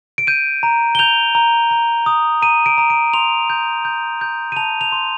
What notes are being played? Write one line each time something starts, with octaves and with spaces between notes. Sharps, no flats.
D7
G6 D#7
A#5
G7
G6 F7
A#5
A#5
D#6
A#5 D#7
D7
A#5
D7
C6 F7
G6
G6
G6
D#7
A5 F7
F7
C6